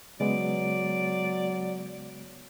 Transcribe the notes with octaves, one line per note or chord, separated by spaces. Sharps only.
C#3 F#3 G#3 B3 D5